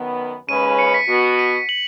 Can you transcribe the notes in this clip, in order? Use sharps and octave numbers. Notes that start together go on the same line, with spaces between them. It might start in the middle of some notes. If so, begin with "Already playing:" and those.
Already playing: F#2 D#3 B3
D#2 C#3 G#3 C#4 B4 D#7
C#7
B6
B2 B3 F#4 C#7
D#7
F#7